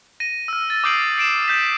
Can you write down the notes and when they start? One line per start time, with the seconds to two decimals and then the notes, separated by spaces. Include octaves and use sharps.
0.20 A#6 D#7
0.48 E6 F6
0.70 A6
0.84 D6 D#6 G6 C7 D7 F#7
1.18 C7 D7 E7
1.48 G6 B6